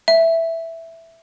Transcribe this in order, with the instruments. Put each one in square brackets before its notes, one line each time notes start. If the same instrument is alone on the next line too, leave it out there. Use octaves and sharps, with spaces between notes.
[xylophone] E5